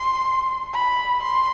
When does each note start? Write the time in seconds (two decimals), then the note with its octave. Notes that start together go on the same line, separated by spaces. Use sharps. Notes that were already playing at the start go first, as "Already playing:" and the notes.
Already playing: C6
0.74 B5
1.23 C6